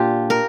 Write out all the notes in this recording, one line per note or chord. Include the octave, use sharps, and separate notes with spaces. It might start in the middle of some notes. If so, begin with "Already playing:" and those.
Already playing: A#2 D4 F4 G4
A#4